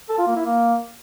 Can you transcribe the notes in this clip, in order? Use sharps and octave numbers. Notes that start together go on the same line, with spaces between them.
A4
F4
A#3
E4
A#3